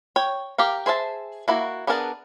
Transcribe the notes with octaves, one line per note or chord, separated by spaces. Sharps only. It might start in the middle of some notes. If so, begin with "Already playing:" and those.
C#5 G5
G4 A#4 F5
G#4 C5 E5 A5
A#3 E4 F#4
B3 D4 G#4 A#4 A5